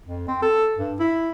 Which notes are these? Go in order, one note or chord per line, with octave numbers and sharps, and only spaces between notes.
F2
C4
A4
G2
E4